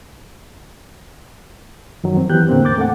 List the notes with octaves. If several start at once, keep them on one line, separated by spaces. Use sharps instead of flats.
F#2 D#3 F#3
C4
E3 B3 G4 F#6 G6
E2 A2 D3 A#3 C4
D6 G6 A6
A3 F#5